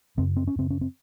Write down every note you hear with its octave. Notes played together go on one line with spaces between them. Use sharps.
F#2 C#3 C4
C4
C#4
F#2 C#3 C4
C#4
C4